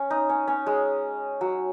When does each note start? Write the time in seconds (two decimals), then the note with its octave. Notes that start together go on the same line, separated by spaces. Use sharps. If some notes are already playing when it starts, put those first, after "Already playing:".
Already playing: C#4
0.10 D#4
0.29 C#4
0.48 C#4
0.66 G#3
1.41 F#3